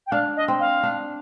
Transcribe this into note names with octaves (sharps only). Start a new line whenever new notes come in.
G5
D4 F5
D#5
C4
F5
D4